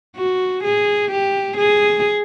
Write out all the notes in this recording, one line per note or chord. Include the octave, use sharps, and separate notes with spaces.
F#4
G#4
G4
G#4